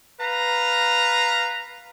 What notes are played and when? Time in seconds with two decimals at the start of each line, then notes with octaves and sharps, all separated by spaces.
0.19 B4 F5 A#5